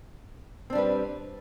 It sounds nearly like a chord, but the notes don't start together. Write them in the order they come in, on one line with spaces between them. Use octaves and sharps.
C4 D4 G3 B4